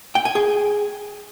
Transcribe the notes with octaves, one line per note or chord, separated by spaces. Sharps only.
G5
G#5
G#4